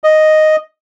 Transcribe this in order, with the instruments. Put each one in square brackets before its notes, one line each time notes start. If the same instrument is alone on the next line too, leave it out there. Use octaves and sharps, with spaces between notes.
[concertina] D#5